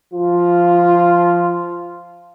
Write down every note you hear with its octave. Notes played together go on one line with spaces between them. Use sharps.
F3 F4